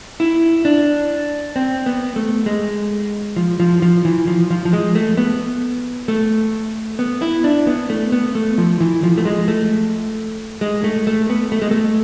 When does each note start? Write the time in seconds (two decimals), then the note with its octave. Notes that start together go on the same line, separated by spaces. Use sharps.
0.20 E4
0.65 D4
1.56 C4
1.86 B3
2.16 A3
2.46 G#3
3.36 F3
3.60 F3
3.82 F3
4.05 E3
4.27 F3
4.50 F3
4.65 F3
4.73 G#3
4.95 A3
5.17 B3
6.08 A3
6.99 B3
7.22 E4
7.44 D4
7.67 B3
7.90 A3
8.12 B3
8.35 A3
8.58 F3
8.80 E3
9.03 F3
9.18 A3
9.25 G#3
9.48 A3
10.61 G#3
10.84 A3
11.07 A3
11.30 B3
11.52 A3
11.62 G#3
11.71 A3